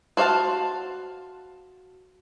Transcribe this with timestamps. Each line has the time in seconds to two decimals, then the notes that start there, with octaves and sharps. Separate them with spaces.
0.17 F#4 C5 D5 F5 A5